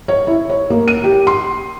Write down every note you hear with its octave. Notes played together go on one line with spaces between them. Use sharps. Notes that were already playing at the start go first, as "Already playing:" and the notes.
C#5
E4
C#5
A#3
D#7
G4
C6